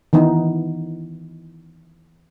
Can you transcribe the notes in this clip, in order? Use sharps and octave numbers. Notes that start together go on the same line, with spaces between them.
D#3 E3 B3 D#4